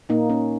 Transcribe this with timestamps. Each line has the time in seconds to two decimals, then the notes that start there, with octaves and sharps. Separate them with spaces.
0.09 A#2 A#3 D#4
0.30 A#3 C#4